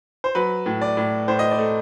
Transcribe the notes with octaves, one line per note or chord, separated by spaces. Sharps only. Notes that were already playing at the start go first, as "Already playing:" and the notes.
C5
F#3 B4
A2
D5
A2
A2 C5
D#5
D5
A3